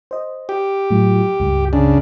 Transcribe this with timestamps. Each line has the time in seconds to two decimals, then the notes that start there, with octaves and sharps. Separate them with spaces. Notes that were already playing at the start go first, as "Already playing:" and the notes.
0.11 C5 D#5
0.49 G4
0.91 A2 F#3 F4
1.40 C#2 G2
1.73 C#3 D4